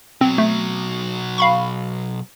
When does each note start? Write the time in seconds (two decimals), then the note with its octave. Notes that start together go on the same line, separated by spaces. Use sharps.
0.21 B2 F#3 C4
0.38 A3
1.38 F5 B5 C#6